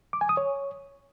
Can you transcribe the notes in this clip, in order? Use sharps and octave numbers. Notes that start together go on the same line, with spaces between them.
D6
G#5
D#6
C#5